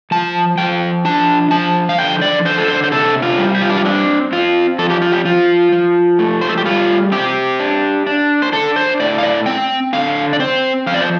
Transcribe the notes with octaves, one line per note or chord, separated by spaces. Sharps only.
F3 A5
F3 G5
D4 A5
F3 A5
F5
D3 G5
D5
D3 C5
A4
C5
C5
C3 A4
F4
G3
G4
F4
D4
F4
C4 D4
C4 F4
F3 A4
G4
F4
G4
F3 F4
F3
A3
C5
A4
G4
G3 F4
C4 G4
D4
D4
C5
D4 A4
C5
A2 D5
F5
D5
C4 G5
D3 F5
D5
C4 C5
F3 F5
D5
C5